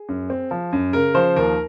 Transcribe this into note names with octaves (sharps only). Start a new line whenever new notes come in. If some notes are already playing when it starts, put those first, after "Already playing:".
Already playing: G#4
F#2
C4
F3
F#2
C#3 A#4
F3 C5
D#2 A#4